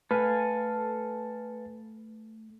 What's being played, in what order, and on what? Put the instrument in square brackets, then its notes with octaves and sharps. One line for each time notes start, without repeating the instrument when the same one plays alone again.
[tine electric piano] A3 [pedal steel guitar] A4 F5 G#5 [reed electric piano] B4